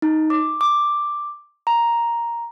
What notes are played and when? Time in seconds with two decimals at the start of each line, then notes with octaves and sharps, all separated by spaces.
0.02 D#4
0.30 D6
0.61 D6
1.67 A#5